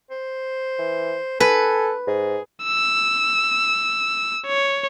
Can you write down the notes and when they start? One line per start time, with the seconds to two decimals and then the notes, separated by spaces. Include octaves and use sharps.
0.11 C5
0.79 E3
1.40 A4 B4 G#5
2.08 G#2 G#4
2.64 E6
4.47 C#5